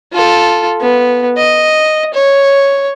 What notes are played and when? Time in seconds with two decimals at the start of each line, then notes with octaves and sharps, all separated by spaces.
0.12 F4 A4
0.81 B3
1.37 D#5
2.14 C#5